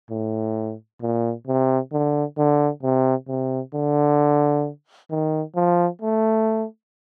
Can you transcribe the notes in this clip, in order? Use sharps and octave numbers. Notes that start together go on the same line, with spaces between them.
A2
A#2
C3
D3
D3
C3
C3
D3
D#3
F3
A3